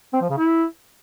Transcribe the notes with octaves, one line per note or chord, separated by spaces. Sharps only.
C4
F3
C#3
E4